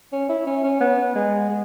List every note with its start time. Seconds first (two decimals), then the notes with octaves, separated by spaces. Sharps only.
0.12 C#4
0.29 E4
0.47 C#4
0.64 C#4
0.80 B3
1.15 G#3
1.49 G#3